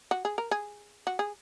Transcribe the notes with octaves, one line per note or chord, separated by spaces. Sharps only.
F#4
G#4
A#4
G#4
F#4
G#4